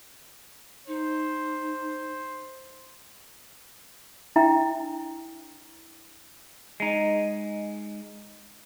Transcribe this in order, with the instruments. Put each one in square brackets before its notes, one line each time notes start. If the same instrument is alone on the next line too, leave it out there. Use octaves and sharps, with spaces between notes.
[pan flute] D#4 [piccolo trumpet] C5
[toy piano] D4 E4 E5 G5 A#5
[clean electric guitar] G#3 D#4